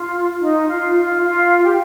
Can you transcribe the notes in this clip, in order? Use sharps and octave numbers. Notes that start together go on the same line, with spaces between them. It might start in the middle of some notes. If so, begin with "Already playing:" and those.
Already playing: F4
D#4
F4
F4
F4
G4